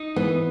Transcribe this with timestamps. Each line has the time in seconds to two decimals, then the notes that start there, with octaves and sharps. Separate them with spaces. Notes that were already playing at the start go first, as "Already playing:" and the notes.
Already playing: D#4
0.16 E3 B3